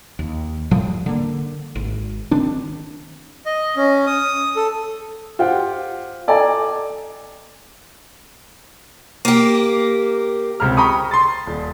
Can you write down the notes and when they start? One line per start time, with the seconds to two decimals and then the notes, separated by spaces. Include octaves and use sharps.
0.19 D#2
0.71 F#1 A2 F3 G3
1.06 D3 A#3
1.75 G#1
2.31 D#3 C4 D4
3.46 D#5
3.76 C#4
4.07 D#6
4.56 A4
5.39 F4 G4 C5 F#5 G5
6.28 A4 D5 D#5 G5 G#5 A#5
9.25 A#3 G4
10.60 C#2 C4 G4 A#5 F6
10.77 G5 A#5 B5 C#6 D#6
11.11 C6 A6
11.46 D#1